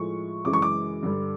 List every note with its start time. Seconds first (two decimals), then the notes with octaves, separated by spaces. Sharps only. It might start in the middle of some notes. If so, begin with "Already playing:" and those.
Already playing: A2 F3 G#3 C#6
0.45 F#2 C#3 E3 G#3 D6
0.53 C#6
0.62 D6
1.03 G2 D3 G3